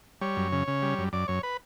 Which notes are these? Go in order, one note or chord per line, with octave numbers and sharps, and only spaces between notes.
G3 C#5
F#2
C#3
C#3
G3
F#2
F#2 D5
F#2 C#5
B4